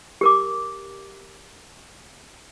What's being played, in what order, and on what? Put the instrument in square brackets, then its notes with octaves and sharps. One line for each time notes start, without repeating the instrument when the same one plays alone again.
[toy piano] G4 A#4 D6